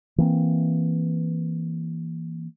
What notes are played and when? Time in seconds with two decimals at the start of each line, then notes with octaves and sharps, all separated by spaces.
0.18 E3 A#3 C4